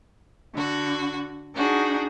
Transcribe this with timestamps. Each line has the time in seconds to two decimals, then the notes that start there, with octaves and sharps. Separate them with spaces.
0.54 D3 F#4
1.54 D4 D#4 F#4 G#4